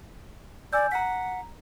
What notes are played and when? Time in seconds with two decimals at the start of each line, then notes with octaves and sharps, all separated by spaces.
0.73 D5 G#5 E6 G6
0.92 F#5 A#5 B6